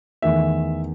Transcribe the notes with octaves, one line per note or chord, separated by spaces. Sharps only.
E2 D#3 A3 E5